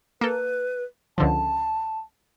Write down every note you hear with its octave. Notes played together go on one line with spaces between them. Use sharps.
A#3 A4 B4
C#2 D3 F3 A5